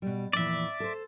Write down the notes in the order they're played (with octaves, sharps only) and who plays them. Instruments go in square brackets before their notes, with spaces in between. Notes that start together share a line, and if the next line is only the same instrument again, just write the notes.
[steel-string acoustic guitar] B2 G3
[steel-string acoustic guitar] F2 A#2 E3 [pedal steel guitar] D5 E5
[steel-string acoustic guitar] A4 C5